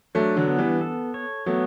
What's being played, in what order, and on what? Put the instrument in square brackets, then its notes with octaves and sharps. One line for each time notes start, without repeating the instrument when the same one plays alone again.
[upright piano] F#3 A3 [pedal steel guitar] D4
[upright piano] D3 F#3
[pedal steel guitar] B3
[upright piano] E3 G3
[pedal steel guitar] A4
C#5
[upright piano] F#3 A3 [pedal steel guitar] B3